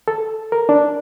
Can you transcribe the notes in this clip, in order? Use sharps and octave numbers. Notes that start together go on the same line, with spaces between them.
A4
A#4
D4